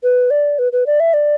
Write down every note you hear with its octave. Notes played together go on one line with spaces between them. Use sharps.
B4
D5
B4
B4
D5
E5
D5